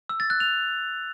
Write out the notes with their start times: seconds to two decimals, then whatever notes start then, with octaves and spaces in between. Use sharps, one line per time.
0.09 E6
0.20 A6
0.30 F#6
0.40 F7